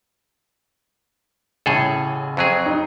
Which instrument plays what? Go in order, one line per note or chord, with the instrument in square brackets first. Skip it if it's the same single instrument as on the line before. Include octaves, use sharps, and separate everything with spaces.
[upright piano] A1 C#3 G#5 [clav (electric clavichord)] A2 G#4 A4
[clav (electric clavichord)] F2 F#3 G#4 [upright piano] C4
[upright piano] D#4